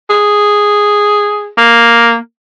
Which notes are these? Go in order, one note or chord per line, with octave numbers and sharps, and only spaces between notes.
G#4
A#3